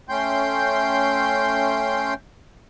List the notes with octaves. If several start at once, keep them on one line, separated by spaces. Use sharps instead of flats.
A3 C#4 G5 C6 G6